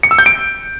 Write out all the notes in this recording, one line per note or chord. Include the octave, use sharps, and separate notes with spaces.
C#7
E6
G6
D7